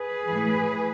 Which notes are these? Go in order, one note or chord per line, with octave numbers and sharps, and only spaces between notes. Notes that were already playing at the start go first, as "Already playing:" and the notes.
Already playing: G#4 B4
A2 E3